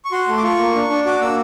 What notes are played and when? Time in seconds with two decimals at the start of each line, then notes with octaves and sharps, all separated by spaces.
0.05 C#6
0.12 F#4 C6
0.28 A3
0.38 D6
0.43 F4 C#6
0.59 A#3
0.75 D4
0.90 D4
1.06 F#4 D6
1.21 A#3 E6